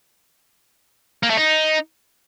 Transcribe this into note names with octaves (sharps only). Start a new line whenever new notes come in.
A#3
A3
D#4